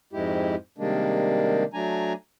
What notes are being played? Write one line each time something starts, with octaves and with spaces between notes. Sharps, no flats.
F2 G#2 G#3 E4 G4
C3 D#3 G3 G#3 A#3 D4
F#3 A3 D4 G#5 A#5